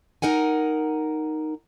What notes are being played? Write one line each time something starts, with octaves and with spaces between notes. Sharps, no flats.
D#4 A#4 F#5 G#5